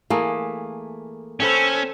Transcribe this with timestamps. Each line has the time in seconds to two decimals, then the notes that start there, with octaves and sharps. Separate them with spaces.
0.10 E3 A3 A#3 G#4
1.40 C#4 A4 B4 C5 E5 G5